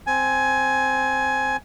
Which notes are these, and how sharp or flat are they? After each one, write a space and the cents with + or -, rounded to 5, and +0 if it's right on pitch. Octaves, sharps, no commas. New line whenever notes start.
C4 +0 G#5 +15